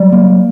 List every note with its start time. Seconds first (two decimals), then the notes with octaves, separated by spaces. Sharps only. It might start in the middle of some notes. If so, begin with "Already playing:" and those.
Already playing: F#3 G3
0.12 A#3